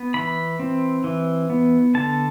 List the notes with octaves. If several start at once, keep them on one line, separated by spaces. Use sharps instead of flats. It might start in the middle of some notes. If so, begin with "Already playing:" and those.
Already playing: B3
E3 B5
C4
E3
B3
D3 A5